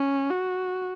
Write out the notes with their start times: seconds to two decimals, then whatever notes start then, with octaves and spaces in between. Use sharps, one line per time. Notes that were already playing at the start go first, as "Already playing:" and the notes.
Already playing: C#4
0.30 F#4